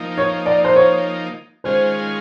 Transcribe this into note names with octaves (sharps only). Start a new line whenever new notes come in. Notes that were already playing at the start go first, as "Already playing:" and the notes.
Already playing: F3 A#3 D#4
C#5
D5
C5
C#5
D#3 G#3 C#4 F4 G#4 C5